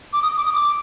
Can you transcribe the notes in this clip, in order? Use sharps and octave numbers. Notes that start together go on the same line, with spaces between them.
D6
D#6
D6
D#6
D6